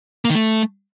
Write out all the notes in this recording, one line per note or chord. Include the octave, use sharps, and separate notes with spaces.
A#3
D#3
A3